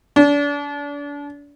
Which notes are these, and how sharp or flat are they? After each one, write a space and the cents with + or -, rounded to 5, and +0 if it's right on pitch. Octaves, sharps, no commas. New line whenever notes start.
D4 -35